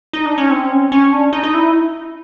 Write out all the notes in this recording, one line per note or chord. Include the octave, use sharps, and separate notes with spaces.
D#4
D4
C#4
C4
C#4
C#4
D4
D#4
D#4
E4